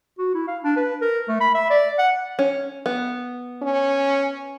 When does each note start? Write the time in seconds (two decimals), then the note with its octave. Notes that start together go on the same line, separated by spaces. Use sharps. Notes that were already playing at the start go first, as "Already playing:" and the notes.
0.18 F#4
0.35 E4
0.48 F5
0.64 D4
0.77 B4
1.01 A#4
1.29 A3
1.41 B5
1.54 E5
1.70 D5
1.99 F#5
2.39 C#4
2.86 B3
3.62 C#4